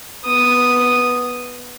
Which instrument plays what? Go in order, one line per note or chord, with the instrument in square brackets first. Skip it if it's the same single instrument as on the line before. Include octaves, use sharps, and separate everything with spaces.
[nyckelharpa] B3 D#6